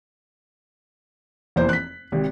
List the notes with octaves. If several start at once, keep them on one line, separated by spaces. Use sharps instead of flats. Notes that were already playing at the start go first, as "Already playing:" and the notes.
F1 E2 A#3 C5
F#6 B6
G#1 C3